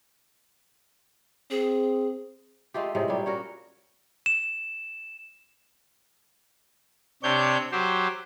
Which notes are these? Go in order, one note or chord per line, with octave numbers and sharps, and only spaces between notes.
C4 G#4
G#3 A3 F4 G4
A2 C3 G#3
A#2 F#3 G3
C#4 F#4 A#4
E7
C3 D4 C#5 G6
F#3 G4 C5